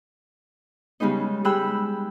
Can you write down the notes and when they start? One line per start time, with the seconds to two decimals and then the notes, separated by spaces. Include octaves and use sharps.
1.00 C#3 G3 G#3 B3 D#4
1.44 G3 G#3 G5 B5 E6 F#6